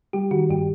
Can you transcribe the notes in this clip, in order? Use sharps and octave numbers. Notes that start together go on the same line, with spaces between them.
G3 G4
D#3 F#4
G2 G4